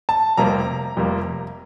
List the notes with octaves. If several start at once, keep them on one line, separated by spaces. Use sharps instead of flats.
A5
F1 F2 C3 G3 A#3 A#5
F1 F2 C3 G3 A#3